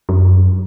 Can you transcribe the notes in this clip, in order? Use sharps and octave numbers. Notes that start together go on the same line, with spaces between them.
F#2